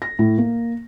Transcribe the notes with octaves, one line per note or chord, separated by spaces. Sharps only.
A#6
A2
A#3